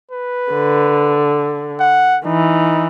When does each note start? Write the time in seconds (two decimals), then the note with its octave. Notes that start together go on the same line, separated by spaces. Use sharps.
0.12 B4
0.53 D3
1.80 F#5
2.25 E3 D#4